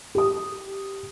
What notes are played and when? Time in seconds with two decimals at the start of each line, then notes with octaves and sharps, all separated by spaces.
0.15 G4 D#6